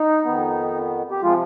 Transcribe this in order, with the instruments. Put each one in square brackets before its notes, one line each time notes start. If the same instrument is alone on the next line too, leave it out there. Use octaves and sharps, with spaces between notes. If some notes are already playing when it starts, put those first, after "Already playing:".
Already playing: [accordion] D#4
F2 D#3 B3
G4
C3 F3 G#3 F4